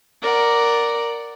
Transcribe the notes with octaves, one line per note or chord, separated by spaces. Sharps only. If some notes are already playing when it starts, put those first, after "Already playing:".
A#4 D5 F#5